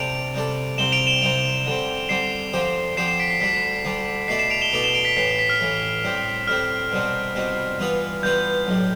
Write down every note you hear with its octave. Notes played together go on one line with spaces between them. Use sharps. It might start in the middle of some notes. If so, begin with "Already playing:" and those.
Already playing: C3 G3 D4 A4 D7 F7
C3 G3 D4 A4
C2 C3 G3 C4 E7 G7
D7 F7
E7 G7
C2 C3 G3 C4 D7 F7
D3 G3 C4
D3 G3 C4 C7 E7
D3 F3 C4 G4 C5
D3 F3 C4 G4 C5 C7 E7
C7 E7
B6 D7
C7
D2 D3 G3 D4 B6
D2 D3 G3 D4
B2 A3 E4 A4 D5 C7
C7 E7
D7 F7
E7 G7
B2 A3 E4 A4 D5 D7 F7
E7 G7
D7 F7
B6 D7
A1 A2 E3 C7
C7
B6
F6
A1 A2 E3
A2 G3 C4
A2 G3 C4 F6
C2 B2 G3 C4
C2 B2 G3 C4
G2 E3 B3 F4 B4
G2 E3 B3 F4 B4 G6
B1 A2 G3